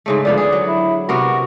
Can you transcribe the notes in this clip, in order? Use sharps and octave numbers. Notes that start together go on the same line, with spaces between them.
G#2 C#3 A3
D3 F3 B3 D5
G#4 D5
F#3
E4
C3 B3 F#4 A#4